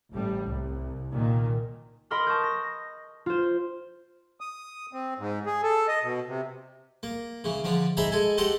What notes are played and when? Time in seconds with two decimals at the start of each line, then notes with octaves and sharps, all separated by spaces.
0.11 A1 A2 G3
0.44 C2
1.10 A#2 D#3
2.11 A#4 D#5 B5 C6 D#6 F6
2.26 A5 C#6 D#6 G6
2.44 A#6
3.26 F4 C5
4.41 D#6
4.93 C4
5.19 G#2
5.46 G#4
5.63 A4
5.88 D#5
6.03 B2
6.28 C3
7.03 A#3
7.44 C#3 E3
7.64 D3 F3 D4
7.97 D#4 G#4 C5 E5 A#5 B5
8.12 G#3 A4 G#5
8.38 G4 A4 C5 D#5 F#5